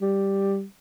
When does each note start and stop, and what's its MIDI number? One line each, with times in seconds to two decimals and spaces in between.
0.01 0.64 55